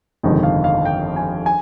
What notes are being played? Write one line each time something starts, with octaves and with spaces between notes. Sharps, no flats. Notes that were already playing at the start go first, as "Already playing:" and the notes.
G1 F2 C3 D#3 G#3
F5
F5
G5
G#5
G#5